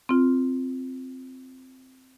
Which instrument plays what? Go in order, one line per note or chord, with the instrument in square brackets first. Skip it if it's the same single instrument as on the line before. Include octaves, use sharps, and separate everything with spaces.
[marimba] C4 F4